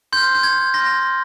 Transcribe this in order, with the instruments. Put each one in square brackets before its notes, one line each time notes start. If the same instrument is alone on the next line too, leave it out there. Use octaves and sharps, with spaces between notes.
[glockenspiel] C6 F6 G6
G6
G#6
C6 F6 A#6